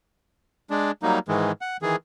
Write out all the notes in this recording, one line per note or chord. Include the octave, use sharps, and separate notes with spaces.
G#3 D4
F#3 G3 A#3 D#4
G#2 D#3 E3 G#3
F#5
D#3 E3 G#4